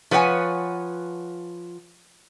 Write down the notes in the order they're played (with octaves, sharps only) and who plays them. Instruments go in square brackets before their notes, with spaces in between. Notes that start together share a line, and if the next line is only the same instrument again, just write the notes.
[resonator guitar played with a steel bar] F3 B4 C#5 F#5 G#5